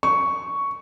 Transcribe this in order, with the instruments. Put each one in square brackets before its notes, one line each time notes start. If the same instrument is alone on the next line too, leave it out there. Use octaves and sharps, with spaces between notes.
[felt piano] C#6